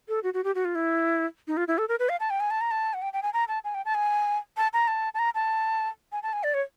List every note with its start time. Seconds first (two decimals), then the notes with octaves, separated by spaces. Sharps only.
0.08 A4
0.23 F#4
0.34 F#4
0.44 G4
0.55 F#4
0.65 F4
0.75 E4
1.48 D#4
1.57 F4
1.68 E4
1.78 A4
1.89 A#4
1.99 B4
2.09 F5
2.20 A5
2.30 G5
2.40 G#5
2.51 A5
2.61 A#5
2.71 A5
2.94 F#5
3.02 G5
3.13 G5
3.23 G#5
3.33 A#5
3.48 A5
3.64 G#5
3.74 G5
3.85 A5
3.95 G#5
4.57 A5
4.73 A#5
4.88 A5
5.14 A5
5.19 A#5
5.35 A5
6.12 G#5
6.23 A5
6.33 G#5
6.43 D5
6.54 C#5